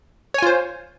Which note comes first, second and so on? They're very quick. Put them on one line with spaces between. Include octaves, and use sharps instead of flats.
C#5 G#5 F4 C5